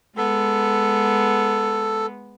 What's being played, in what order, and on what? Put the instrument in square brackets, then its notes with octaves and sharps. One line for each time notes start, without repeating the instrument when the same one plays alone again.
[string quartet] G#3 B3 [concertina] A4